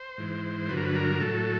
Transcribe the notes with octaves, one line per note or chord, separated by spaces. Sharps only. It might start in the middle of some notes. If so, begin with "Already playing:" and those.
Already playing: C5
G#2 E3
G2 D3 F#3 B4
A#4
B4
A#4
A2 F#3 A4